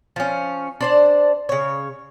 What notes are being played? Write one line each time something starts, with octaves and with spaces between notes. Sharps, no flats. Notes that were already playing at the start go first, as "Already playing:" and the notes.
F3 C#4
D4 C5 D5
C#3 C#5